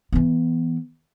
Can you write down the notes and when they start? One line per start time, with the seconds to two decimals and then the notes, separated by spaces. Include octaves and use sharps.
0.13 E3 B3